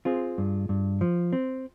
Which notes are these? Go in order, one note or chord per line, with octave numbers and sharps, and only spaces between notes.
C4 F4 G#4
G2
G2
F3
C4